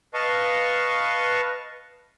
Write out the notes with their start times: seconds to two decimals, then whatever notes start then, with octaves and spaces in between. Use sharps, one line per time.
0.14 B4 D#5 F5 A5 C#6